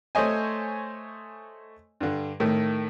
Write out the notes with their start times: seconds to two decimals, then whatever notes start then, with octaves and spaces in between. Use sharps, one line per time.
0.15 A3 C5 C#5 D#5 G#5
2.01 G2 D3
2.40 A2 D#3 A3